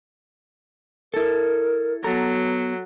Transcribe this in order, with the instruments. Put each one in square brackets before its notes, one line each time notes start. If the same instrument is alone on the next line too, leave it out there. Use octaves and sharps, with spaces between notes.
[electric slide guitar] E4 A4 [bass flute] A#4
[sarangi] F#3 [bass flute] B3 [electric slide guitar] A4 A#5